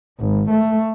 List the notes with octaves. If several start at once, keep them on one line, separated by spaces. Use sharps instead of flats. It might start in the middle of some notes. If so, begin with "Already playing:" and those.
G#1
A3